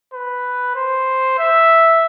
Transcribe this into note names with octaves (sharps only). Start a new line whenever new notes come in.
B4
C5
E5